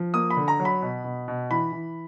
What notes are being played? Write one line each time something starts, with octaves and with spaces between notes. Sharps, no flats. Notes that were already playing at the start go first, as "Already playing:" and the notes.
Already playing: F3
A#3 D#6
B5
D3
A#5
F#3
B5
B2
B2
B2
E3 B5
E3